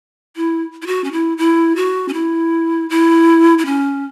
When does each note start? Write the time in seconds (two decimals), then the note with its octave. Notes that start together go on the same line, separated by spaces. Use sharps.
0.36 E4
0.82 E4
0.87 F#4
1.04 C#4
1.12 E4
1.38 E4
1.76 F#4
2.09 C#4
2.14 E4
2.90 E4
3.58 E4
3.66 C#4